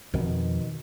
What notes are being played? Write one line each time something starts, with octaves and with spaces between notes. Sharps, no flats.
F2 B2 D#3